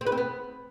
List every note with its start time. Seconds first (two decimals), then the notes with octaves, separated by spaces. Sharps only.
0.01 C4
0.07 B4
0.12 C4
0.18 B3